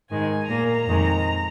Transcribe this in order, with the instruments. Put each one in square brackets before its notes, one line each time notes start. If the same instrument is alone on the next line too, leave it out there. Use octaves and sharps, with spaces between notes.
[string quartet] G#2 D#3 G#3 G#5
A#2 A#3 A#5
F2 D#3 G#3